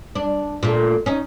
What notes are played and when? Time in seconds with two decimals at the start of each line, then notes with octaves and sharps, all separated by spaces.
0.15 D4
0.63 A#2 A3
1.06 C#4 D#4